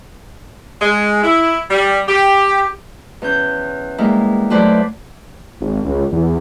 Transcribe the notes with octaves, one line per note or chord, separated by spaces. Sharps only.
G#3
E4
G3
G4
E2 C#4 G6
G3 G#3 A#3 E4
F#3 A3 E4 B4 C5 D5
G#1
C#2
E2